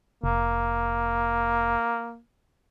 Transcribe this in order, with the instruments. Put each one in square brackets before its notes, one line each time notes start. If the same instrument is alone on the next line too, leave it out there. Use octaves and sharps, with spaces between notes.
[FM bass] F1 [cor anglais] A#3